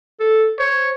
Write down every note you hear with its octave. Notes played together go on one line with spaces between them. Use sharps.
A4
C5 C#5